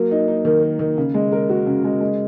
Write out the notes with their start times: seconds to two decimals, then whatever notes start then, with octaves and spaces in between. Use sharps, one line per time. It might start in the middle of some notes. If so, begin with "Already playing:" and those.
Already playing: F#3 A#3
0.11 D#4
0.28 D#4
0.45 D#3
0.63 A#3
0.79 D#3
0.97 C#3
1.14 G#3
1.32 A#4
1.49 F#4
1.67 C#3
1.84 G#3
2.01 G#3